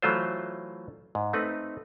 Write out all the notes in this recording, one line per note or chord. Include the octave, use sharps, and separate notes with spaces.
E3 F#3 A3 F4 C5
G#2
A3 C4 D#4 B4